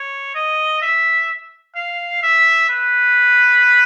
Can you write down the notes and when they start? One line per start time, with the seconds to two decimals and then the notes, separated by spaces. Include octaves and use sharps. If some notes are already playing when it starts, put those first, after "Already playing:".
Already playing: C#5
0.35 D#5
0.82 E5
1.76 F5
2.23 E5
2.69 B4